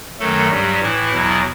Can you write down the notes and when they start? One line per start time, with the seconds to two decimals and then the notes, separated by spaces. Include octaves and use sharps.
0.19 F#2 D#3 F#3 A3 A4
0.50 G2 F#3 G3 G4
0.82 A2 E3 E4
1.13 E2 B2 F#3